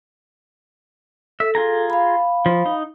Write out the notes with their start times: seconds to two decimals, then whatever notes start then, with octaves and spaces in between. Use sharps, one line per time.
1.40 A4 E5
1.55 F4 G#4 A#5
1.90 F5 B5
2.46 F3
2.66 D#4